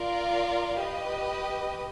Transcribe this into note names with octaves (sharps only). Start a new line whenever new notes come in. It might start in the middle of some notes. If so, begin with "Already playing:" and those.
Already playing: F4 A#4 D5 F5
G4 B4 D#5